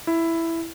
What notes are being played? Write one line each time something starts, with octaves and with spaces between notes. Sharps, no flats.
E4